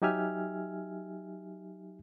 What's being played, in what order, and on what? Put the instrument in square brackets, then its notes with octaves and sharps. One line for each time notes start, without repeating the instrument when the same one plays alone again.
[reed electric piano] F#3 D#4 G4 E5 G#5 F6